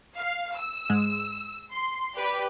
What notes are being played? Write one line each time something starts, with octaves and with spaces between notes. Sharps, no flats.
F5
E6
G#2 G#3
C6
G4 B4 D5